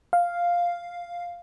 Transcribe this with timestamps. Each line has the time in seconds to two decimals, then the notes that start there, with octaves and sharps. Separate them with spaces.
0.13 F5